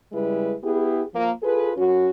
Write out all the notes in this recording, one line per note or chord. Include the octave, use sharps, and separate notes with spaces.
C#3 G3 G#3 E4 B4
B3 E4 G4 G#4
F3 A#3
F4 G#4 A4 B4
F#2 C#4 F#4